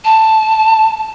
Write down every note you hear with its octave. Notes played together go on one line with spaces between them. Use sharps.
A5